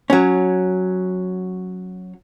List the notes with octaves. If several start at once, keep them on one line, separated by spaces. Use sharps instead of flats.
F#3 C#4